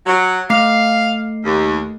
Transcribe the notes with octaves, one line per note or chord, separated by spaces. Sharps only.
F#3
A3 F5 C7
D#2